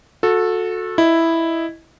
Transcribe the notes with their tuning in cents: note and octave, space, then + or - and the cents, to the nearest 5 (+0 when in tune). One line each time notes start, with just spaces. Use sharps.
F#4 -30 A4 +0
E4 +0 D#5 +0